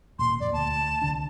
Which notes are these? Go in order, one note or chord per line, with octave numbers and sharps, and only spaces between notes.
D#1 A#2 C6
F2 A#2 D5
D2 A5
C2 D3 D4